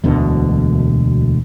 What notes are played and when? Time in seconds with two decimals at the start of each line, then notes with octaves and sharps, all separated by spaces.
0.04 E1 D2 B2 D3